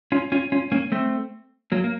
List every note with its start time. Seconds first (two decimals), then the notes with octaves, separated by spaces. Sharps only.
0.12 C#4 F4
0.32 C#4 F4
0.52 C#4 F4
0.72 A#3 C#4
0.92 A3 C4
1.72 F#3 A#3
1.84 A#3